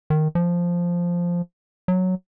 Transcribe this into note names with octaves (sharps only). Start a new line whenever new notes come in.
D#3
F3
F#3